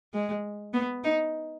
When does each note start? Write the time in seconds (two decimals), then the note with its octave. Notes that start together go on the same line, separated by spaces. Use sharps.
0.14 G#3
0.74 B3
1.04 D#4